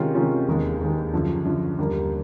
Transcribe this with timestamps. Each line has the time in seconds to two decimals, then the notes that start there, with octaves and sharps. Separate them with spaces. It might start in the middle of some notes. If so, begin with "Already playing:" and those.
Already playing: C3 D#3 G#3 C#4 F4
0.14 C3 D#3 G#3 C#4 F4
0.47 E1 D#2 D#3 G#3
0.80 E1 D#2 D#3 G#3
1.13 F#2 D3 F3
1.45 F#2 D3 F3
1.78 D#2 D3 G3 A#3